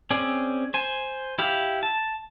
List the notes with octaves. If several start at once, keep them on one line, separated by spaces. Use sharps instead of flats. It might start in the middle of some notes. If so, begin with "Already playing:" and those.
C4 C#4 G#4 D5
C5 G#5
E4 G4 F5
A5